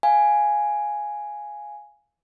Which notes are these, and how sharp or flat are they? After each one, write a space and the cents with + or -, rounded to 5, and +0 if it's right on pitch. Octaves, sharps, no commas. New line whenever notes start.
F5 +0 G#5 +0